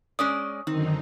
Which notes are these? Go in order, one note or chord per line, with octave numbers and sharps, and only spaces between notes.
G#3 C#4 D5 D#6
F#2 D3 D#3 C4 D#4